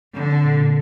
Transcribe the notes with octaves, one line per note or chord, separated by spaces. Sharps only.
D3 C4
G#3
A#2
A#2